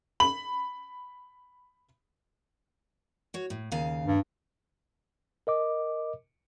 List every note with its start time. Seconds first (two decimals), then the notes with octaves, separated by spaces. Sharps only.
0.20 B5 F#7
3.34 F#4 C#5
3.50 A2
3.72 D#2 C#3 F5
4.06 G2
5.47 A#4 D#5 D6